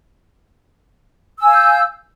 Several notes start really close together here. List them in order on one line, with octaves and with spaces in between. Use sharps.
E6 G#5 F5 G6